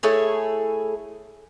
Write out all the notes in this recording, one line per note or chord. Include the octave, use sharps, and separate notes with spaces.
A3 E4 G#4 C#5